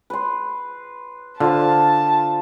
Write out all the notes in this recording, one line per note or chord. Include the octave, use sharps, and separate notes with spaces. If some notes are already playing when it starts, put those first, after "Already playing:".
B4 C6
D3 F4 C5 A5